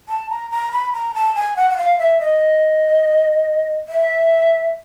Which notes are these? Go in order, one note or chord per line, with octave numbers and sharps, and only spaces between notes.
A5
A#5
A#5
B5
A#5
A5
G#5
F#5
F#5
F5
E5
D#5
E5